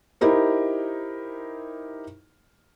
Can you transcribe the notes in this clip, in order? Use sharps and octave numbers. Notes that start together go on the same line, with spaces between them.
D#4 E4 G4 A#4 C5